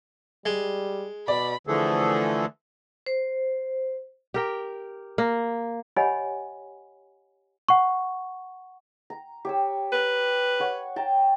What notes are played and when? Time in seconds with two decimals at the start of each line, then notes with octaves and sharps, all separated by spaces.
0.46 G3 G#3
1.28 B2 D5 B5
1.67 D3 E3 F3 A3 G#4 A4
3.06 C5
4.34 G4 A#4 G5
5.18 A#3
5.97 G4 C#5 D#5 F#5 G#5 B5
7.68 F#5 C#6
9.10 A#5
9.45 G4 C#5 E6
9.93 B4
10.60 C#5 F#5
10.96 G5 A5 A#5